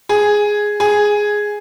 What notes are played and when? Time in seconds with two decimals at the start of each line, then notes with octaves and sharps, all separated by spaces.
0.09 G#4
0.80 G#4